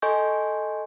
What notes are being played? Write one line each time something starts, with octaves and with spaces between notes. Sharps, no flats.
A4 D#5 G#5 C6 C#6 G6